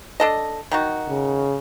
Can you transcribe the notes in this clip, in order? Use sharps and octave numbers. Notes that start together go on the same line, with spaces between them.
D4 A4 D#5
D#3 D#4 F#4
C#3